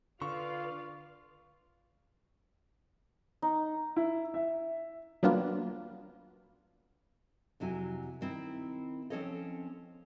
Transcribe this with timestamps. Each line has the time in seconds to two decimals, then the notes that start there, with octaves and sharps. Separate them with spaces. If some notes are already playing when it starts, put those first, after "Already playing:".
0.22 D3 F4 B4 D5 F5 C#6
3.42 D#4
3.96 E4
4.34 E5
5.23 F#3 G3 A#3 B3 D4 F4
7.60 F2 C3 F#3 E4 G#5
8.21 D#3 C4 E4
9.10 F3 C4 C#4 A4 C#5 D#5